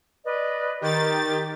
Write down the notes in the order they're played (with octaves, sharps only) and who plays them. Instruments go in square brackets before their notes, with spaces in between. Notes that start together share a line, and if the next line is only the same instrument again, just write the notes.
[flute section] B4 D5 D#5
[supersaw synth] D#3 A6 [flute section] G4